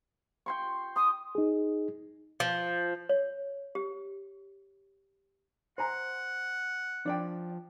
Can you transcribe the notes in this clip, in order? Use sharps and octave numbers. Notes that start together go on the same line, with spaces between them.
G5 C6 C#6
C6 D#6
D#4 G#4
F3
C#5
G4
C5 F#5 G#5 A#5
F3 D4 D5 G5